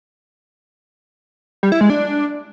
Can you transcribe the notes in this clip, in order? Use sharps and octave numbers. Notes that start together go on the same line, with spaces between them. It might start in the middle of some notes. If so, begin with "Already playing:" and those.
G3
E4
G#3
D4